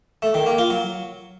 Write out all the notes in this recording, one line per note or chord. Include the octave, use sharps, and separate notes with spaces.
A3
D#3
A#3
F4
F#3